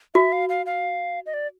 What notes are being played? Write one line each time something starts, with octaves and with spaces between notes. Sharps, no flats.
F#4 E5
F5
F5
F5
D#5
D5